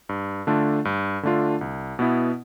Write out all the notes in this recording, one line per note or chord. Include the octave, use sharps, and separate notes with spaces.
G2
D3 A3 D4 F4
G2
D3 A3 D4 F4
C2
B2 B3 E4